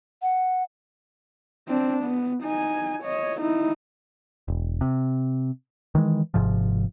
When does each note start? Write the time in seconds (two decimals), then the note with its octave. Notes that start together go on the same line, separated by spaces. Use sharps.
0.22 F#5
1.69 C4 D4
2.04 B3
2.43 D#4 G#5
3.03 C#5 D#5
3.40 D#4 E4
4.48 E1
4.81 C3
5.95 D#3 E3 G#3
6.34 G#1 G#2 C3 F3